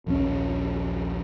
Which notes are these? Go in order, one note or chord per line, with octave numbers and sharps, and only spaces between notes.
A#1 D#2 C#3 C#4